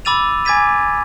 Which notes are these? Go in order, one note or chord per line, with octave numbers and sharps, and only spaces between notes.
B5 D6 E6 A6 D#7 F7
G#5 D6 G#6 A6 B6 D#7